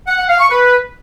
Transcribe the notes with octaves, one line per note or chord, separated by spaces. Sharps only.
F#5
F#5
F5
C#6
B4